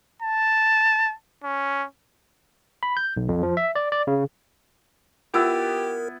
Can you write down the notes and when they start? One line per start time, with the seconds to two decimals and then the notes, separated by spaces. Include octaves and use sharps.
0.23 A5
1.44 C#4
2.83 B5
2.97 G6
3.17 B1
3.29 F2
3.43 F3
3.57 E5
3.75 D5
3.92 D5
4.07 C#3
5.34 B3 E4 F4 G4 A#4 E6